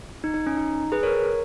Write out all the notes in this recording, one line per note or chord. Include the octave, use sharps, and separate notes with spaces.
D#4
D#4
C#4
D#4
G#4 B4
A#4 C#5